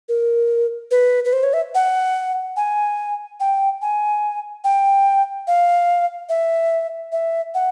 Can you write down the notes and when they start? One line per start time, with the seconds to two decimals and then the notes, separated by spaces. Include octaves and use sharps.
0.09 A#4
0.91 B4
1.25 B4
1.33 C5
1.43 C#5
1.53 E5
1.75 F#5
2.57 G#5
3.40 G5
3.82 G#5
4.64 G5
5.47 F5
6.29 E5
7.12 E5
7.54 F#5